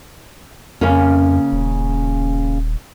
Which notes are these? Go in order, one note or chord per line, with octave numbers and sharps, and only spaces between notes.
F2 C#3 A#3 C#4
D#1